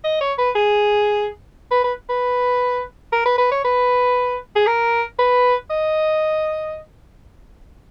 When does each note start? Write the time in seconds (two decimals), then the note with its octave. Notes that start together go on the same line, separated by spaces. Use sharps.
0.04 D#5
0.21 C#5
0.38 B4
0.55 G#4
1.71 B4
1.84 B4
2.09 B4
3.12 A#4
3.25 B4
3.38 B4
3.52 C#5
3.65 B4
4.56 G#4
4.67 A#4
5.19 B4
5.70 D#5